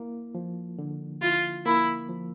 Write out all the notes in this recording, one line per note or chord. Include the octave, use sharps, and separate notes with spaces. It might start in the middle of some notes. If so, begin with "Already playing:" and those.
Already playing: A#3 E4
F3
D3
E4 F4
A#3 E4
F3